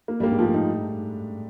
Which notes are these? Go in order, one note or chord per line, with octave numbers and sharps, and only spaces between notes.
A#3
G2 G3 A#3
G#2 G#3
A2 F3 A3
D#4